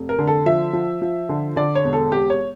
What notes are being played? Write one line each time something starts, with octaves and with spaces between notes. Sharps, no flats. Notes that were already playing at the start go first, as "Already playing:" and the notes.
Already playing: F1
A#4
D3
A4
F3 E5
F3
F3
D3
D3 D5
C#5
E1
A4
E1 G4
C#5